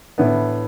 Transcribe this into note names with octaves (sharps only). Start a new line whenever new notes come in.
A2 E3 B3 D4